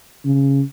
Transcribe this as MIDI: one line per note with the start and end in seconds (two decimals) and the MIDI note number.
0.25 0.61 49